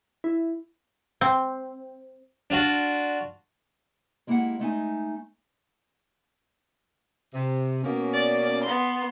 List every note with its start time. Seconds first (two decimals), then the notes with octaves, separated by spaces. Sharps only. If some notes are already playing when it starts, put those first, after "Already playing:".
0.24 E4
1.21 C4
2.50 D4 F4 F#4
4.27 G#3 A#3 E4 G4 F5 F#5
4.59 G#3 A3 D#4 G#5
7.34 C3
7.84 B2 A#3 C#4
8.13 D5
8.63 B3 C6